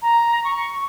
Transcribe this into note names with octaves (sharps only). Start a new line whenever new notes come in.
A#5
C#6